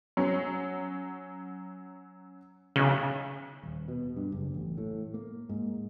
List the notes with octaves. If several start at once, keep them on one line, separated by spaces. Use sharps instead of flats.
F#3 C#4
B1 C#3
D#1
B2
G2
F#1
A1
A2
A#3
G#2